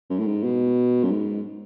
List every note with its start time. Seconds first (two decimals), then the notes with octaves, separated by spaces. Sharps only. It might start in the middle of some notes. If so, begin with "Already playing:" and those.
0.10 F#2
0.19 A2
0.27 G#2
0.44 B2
1.04 F#2
1.11 G#2